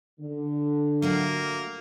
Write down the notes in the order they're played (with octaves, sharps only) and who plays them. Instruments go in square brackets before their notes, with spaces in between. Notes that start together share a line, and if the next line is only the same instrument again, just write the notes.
[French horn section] D3
[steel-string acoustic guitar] F#3 A3 F4 [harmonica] A#3